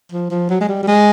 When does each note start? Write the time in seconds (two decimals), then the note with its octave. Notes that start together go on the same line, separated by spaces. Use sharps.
0.12 F3
0.31 F3
0.49 F#3
0.61 G#3
0.69 G3
0.83 G3
0.88 G#3